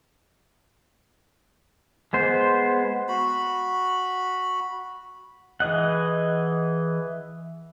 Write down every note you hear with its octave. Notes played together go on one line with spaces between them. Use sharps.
G#3 B3 C5
F#4 B5
E3 G#4 D#5 F#5